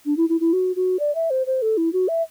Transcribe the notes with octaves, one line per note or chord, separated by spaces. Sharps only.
D4
E4
E4
E4
F#4
F#4
D5
E5
C5
C5
A4
E4
F#4
E5